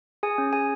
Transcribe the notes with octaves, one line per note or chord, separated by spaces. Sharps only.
G#4 G#5
C#4
G#4 G#5